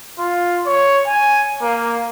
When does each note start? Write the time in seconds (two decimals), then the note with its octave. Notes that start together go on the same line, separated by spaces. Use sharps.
0.19 F4
0.66 C#5
1.07 G#5
1.62 A#3